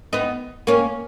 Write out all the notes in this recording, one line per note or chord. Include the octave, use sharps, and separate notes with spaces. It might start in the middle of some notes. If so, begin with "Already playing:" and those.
B3 D#4
A#3 C#4